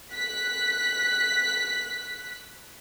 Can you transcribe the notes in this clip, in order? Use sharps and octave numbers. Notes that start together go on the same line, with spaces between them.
F#6 B6